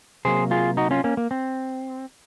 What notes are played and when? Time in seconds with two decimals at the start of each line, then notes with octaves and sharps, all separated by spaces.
0.25 C3 F#3 A#3 G#4 C5
0.51 F4 G#4
0.77 D#4 F#4
0.91 C#4 F4
1.04 A#3 C#4
1.17 A#3
1.31 C4